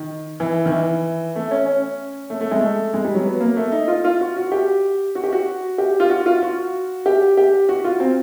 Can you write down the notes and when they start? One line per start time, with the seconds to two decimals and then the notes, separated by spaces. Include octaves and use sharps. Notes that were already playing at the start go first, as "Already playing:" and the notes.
Already playing: D#3
0.40 E3
0.65 D#3
0.72 E3
1.36 A3
1.51 C#4
1.66 C#4
2.30 A3
2.41 A3
2.51 G#3
2.61 A3
2.94 G#3
3.04 G3
3.14 F#3
3.25 B3
3.41 A#3
3.57 A3
3.72 D#4
3.88 F4
4.05 F4
4.21 F#4
4.36 F#4
4.52 G4
5.15 F#4
5.24 G4
5.32 F#4
5.78 G4
6.00 F4
6.10 F#4
6.26 F4
6.42 F#4
7.06 G4
7.37 G4
7.69 F#4
7.84 F4
8.00 C4